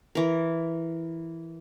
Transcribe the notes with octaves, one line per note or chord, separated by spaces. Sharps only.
E3 A#4